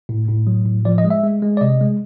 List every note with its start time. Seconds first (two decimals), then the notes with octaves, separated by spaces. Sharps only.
0.09 A2
0.28 A2
0.47 F#3
0.66 A2
0.85 F3 D5
0.98 D#5
1.04 G#3
1.10 E5
1.24 G#3
1.42 G#3
1.57 D5
1.61 C3 D#5
1.81 G#3